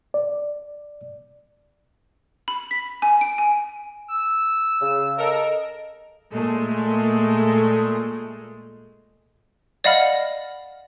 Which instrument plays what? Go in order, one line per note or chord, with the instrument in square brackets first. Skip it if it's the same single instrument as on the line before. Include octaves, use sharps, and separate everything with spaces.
[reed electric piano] D5
[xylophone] B5
B6
G#5
D7
G#5
[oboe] E6
[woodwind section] C#3
[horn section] A4 A#4 [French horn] D#5
[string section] A#2 G#3 A3
[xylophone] D5 D#5 F5 F#5 B5 F6